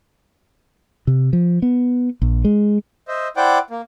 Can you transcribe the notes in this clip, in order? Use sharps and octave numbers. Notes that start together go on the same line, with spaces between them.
C3
F3
B3
A#1
G#3
C5 D#5 E5
E4 C5 D5 F#5 G5 D6
A#3